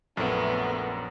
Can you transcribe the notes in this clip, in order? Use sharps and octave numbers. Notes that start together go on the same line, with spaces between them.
A#1 F#2 A3 B3